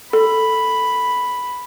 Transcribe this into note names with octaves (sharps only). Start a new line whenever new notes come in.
A4 B5